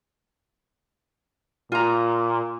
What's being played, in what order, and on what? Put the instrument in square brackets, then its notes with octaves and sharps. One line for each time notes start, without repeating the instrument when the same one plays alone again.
[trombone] A#2 [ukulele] F4 A#5